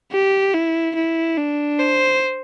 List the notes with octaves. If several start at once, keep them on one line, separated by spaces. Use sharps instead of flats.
G4
E4
E4
D4
C5